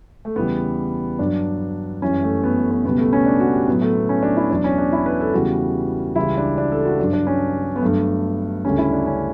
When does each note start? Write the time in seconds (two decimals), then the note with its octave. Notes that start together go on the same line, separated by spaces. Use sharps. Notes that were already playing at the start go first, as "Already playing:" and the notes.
0.25 A3
0.36 E2 C#3 E3 G3 B3
1.19 G2 F#3 D4
2.02 F#2 E3 G3 C#4
2.23 A3
2.43 B3
2.57 A3
2.71 B3
2.85 C#2 B2 G3 B3
2.98 A3
3.13 C#4
3.26 D4
3.40 F#4
3.53 G4
3.68 A2 F#3 B3
3.82 A3
3.96 B3
4.09 C#4
4.23 D4
4.36 E4
4.50 E2 B2 F#3 D4
4.64 C#4
4.78 D4
4.92 E4
5.06 B4
5.20 A4
5.33 E2 C#3 E3 G3 F#4
6.16 C#2 C#3 E3 G3 E4
6.37 D4
6.58 D4
6.72 A4
6.85 F#4
6.99 G2 F#3 D4
7.13 D4
7.27 C#4
7.76 B3
7.82 G2 F#3 A3
8.65 D2 C#3 G3 C#4
8.78 E4
8.92 D4
9.06 C#4